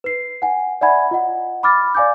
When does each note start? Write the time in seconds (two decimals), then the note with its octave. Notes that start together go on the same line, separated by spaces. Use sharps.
0.04 B4 C7
0.42 F#5 G#5
0.81 D5 E5 F#5 G#5 B5 G#6
1.11 F4 D#5 F#5
1.63 B5 D6 F6 A6
1.95 D5 F5 G#5 D6 G6